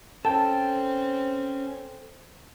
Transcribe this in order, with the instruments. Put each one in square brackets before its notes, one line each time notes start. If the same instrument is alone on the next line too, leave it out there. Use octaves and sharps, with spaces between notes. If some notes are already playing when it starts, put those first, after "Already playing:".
[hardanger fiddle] C4 [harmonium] C#4 [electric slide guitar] A4 G5 [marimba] A5